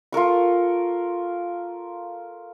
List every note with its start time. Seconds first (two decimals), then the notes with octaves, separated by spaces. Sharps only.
0.12 F4 A4 A#4 C#6